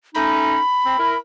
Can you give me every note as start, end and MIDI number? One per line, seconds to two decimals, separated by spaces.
0.15 0.59 57
0.15 0.59 61
0.15 0.59 63
0.15 1.18 83
0.85 0.95 60
0.99 1.16 64
0.99 1.16 70